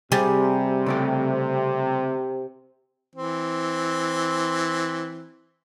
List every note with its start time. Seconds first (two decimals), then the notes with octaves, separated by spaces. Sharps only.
0.12 C3 G3 G#4
0.86 C#3 A3 G4
3.15 E3 C4